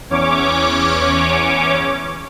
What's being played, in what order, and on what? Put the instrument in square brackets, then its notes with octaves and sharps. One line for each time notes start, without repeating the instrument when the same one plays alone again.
[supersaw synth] E2 C#4 C#5 D6